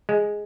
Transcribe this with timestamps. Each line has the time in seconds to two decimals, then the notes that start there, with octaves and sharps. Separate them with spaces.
0.09 G#3